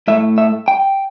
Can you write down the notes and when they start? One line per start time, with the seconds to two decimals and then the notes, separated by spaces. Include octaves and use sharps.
0.08 A2 A3 E5
0.38 E5
0.68 G5